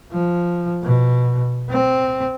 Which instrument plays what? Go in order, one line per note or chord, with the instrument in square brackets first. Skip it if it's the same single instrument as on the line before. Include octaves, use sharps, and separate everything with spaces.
[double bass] F3
B2
C4